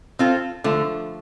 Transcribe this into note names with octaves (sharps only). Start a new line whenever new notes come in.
C4 F4 A4
D3 F3 A3